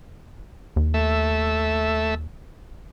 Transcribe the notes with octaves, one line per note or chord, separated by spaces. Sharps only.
D#2
A3 E5